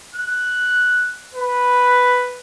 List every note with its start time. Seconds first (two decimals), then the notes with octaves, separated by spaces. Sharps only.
0.15 F#6
1.34 B4